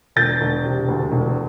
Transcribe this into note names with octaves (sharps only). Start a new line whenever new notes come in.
E1 G6 A6
E1
C3
D2
E1